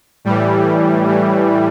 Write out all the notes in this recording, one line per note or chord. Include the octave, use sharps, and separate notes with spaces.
A2 E3 G3
A2 E3